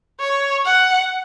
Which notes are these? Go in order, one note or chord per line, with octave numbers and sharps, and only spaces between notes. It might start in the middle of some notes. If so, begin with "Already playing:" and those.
C#5
F#5